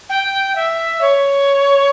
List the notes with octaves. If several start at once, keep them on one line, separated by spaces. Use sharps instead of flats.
G5
E5
C#5